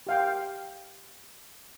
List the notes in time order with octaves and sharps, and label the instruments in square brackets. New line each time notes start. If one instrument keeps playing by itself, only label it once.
[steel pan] G4 F5 G5